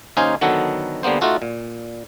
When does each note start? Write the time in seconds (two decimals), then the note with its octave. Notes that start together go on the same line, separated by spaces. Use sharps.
0.17 D#2 C#4 D#4 C5 F5 G#5
0.41 D3 D#3 F#3 B3 F#4 A4
1.03 D3 G3 A#3 B3 C5
1.21 A3 D#4 F4 F#4 A4
1.42 A#2